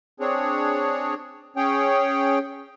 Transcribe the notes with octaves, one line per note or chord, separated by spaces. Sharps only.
C4 D4 G#4 C#5
C#4 G#4 C#5 G5